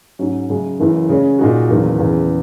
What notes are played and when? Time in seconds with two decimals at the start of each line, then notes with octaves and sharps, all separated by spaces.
0.19 G#2 F#3 C#4
0.49 F#2 C#3 G#3
0.80 F#1 F#2 E3
1.09 C#3 G#3 C#4
1.39 A#2 G#3 D#4 F#4
1.70 F#1 E2 D#3 F#3 A#3
1.99 E2 C#3 G#3